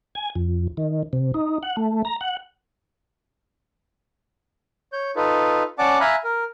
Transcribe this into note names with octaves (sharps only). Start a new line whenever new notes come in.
G#5
F2
D#3
C3
D#4
F#5
A3
A#5
F#5
C#5 G6
D#4 F4 A4 B4
C#4 D5 F#5 A5 D6
E5 F5 G#5 A#5 B5 F#6
A#4